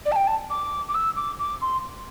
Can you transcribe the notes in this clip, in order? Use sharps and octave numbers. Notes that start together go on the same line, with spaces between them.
D5
A5
G5
A5
D6
D6
E6
D6
D6
C6